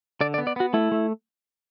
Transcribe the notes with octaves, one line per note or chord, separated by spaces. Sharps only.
D3 D5
D5
B3
D5
B3 F#4
A3 E4
A3